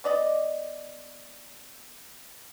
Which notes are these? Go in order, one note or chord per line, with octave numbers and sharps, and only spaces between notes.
B3 D5 D#5